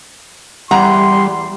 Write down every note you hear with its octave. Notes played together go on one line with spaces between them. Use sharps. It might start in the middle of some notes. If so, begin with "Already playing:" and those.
E2 G3 F#5 A#5 C6